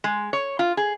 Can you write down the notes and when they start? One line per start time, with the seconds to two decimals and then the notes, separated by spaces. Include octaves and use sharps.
0.04 G#3
0.33 C#5
0.59 F4
0.77 G#4